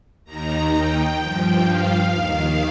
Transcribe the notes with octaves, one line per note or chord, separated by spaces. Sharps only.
D#2 D#3 A#5
G5
G2 F3
F5
D#2 D#3